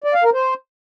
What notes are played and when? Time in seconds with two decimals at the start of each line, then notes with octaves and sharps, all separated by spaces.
0.04 D5
0.14 F5
0.24 A#4
0.34 C5